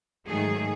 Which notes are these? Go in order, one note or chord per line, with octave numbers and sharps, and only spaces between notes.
G#2 D#3 F#3 A3 G#4